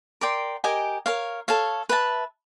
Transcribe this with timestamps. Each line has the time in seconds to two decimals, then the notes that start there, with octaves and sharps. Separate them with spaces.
0.21 A#4 D5 G5 C6
0.64 G4 A#4 D#5 G#5
1.06 A#4 C#5 F5
1.48 A4 C#5 F5
1.89 B4 E5 A5